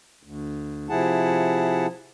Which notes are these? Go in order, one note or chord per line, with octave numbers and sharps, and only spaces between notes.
D2
C3 F3 E4 G#4 F#5 A5